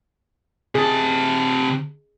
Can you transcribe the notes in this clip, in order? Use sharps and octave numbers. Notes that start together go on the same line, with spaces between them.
C3 G#4 A5